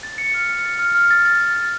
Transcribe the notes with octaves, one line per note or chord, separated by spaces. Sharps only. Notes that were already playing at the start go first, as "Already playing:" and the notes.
A6
C#7
F6
C#7
A6
F6
F6
A6
A6
A6
A6